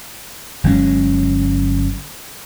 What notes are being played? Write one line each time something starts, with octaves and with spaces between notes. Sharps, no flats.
G1 F#3 G#3 C#4